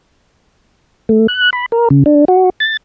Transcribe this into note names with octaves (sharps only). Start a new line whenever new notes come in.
A3
F#6
B5
A#4
C#3
D4
F#4
A6